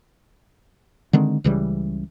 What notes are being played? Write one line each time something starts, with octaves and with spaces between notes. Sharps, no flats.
D3 D#3 G#3 C4
C#2 C#3 E3 G3